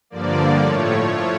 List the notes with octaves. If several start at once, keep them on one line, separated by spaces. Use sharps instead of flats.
G2 D3 F3 A#3 D5
A2 F3 A3 C#5